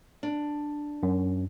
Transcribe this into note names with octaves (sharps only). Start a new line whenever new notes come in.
D4
F#2